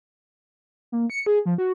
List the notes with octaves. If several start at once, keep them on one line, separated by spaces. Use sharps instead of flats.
A#3
C#7
G#4
F3
F#4